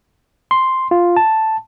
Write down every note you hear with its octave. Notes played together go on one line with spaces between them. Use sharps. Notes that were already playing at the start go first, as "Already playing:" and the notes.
C6
F4
A5